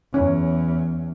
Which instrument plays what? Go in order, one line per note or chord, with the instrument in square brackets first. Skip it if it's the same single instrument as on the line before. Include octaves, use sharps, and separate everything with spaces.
[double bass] E2 [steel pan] C#4